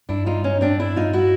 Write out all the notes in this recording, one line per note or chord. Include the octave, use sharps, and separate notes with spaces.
G2 D4 E4
D#4 F4
C#4 D#4
C4 D4
D4 E4
D#4 F4
E4 F#4